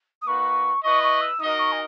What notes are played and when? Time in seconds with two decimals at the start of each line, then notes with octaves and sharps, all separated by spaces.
0.21 D#6
0.27 A#3 D#4 F#4 B4 C#6
0.83 E4 B4 D#5 C#6
1.03 C#6
1.21 E6
1.40 D#4 F#4 A#4 D#5 D#6
1.59 C#6
1.72 G#5